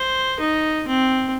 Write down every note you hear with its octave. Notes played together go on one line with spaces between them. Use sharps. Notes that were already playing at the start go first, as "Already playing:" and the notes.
Already playing: C5
D#4
C4